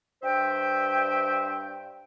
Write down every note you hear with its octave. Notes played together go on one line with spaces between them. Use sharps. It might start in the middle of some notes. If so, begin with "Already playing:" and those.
G2 C5 E5 G5